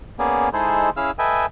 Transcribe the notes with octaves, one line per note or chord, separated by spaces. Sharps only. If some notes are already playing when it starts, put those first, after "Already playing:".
A#3 B3 C#4 G#4 D5
G#3 D#4 E4 G#4 A4 C5
C#4 E4 G#4 F5 E6
A4 B4 D#5 E5 G5 G#5